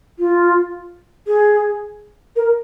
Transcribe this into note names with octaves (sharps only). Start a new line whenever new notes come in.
F4
G#4
A#4